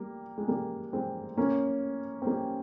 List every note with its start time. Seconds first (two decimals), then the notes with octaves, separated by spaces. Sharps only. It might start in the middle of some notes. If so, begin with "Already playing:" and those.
Already playing: G3 A#3
0.38 G#3
0.48 G3 A#3
0.93 G#3 C4
1.37 A#3 C#4
2.22 C4
2.26 G3 A#3